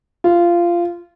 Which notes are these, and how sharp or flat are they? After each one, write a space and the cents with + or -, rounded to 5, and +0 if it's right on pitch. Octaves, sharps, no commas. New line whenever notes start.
F4 -15